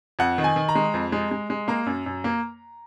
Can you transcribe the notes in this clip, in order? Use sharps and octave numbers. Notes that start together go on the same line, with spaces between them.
F2 F#5
D#3
G#5
D#3
A#5
G#3
F2
G#3
G#3
G#3
A#3 A#5
F#2
F#2
A#3